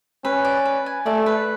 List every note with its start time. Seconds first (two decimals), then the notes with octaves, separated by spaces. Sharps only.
0.25 C#4 B4
0.45 D5
0.65 B4
0.86 G#5
1.06 A3 D5
1.26 B4